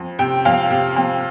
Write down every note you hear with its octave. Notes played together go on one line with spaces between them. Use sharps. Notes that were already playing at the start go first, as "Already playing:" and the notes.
Already playing: F2
C3 G5
F2 F5
C3
F2